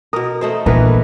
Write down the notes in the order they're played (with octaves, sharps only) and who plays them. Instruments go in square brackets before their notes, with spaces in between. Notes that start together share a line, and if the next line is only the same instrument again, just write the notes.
[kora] B2 A#4 [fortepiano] D#6
[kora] A3 D#4 C5
[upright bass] A#1 [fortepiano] E3 B3 [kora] A3 A#4 B4